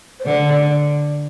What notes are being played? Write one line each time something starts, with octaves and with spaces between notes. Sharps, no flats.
C5
D3 D5